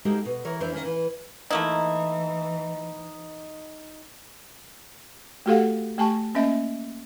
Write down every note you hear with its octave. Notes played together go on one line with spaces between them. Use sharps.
G#3 A#3 D#4 F#4 G4 A4
B2
E3 A#4 C#5
F2 E3 D4 C5
D#3 E3 A#3 C#4
E3
E3 A3 A#3 D#4 E4
A3 F#4 G4 A4 F5 F#5
A3 G4 G#5 A5 C#6
A#3 C#4 D#5 E5